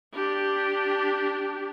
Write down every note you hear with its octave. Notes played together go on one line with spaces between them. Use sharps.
D4 G4